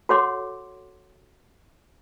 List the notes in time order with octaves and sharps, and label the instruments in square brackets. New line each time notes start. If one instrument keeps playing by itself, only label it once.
[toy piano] F#4 A4 C#5 F#5 C6 D6